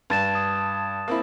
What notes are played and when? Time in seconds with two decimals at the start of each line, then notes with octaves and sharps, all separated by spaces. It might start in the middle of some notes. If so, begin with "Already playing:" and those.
0.10 G2 A5 A6 E7
0.35 D#6
1.08 A#3 C4 E4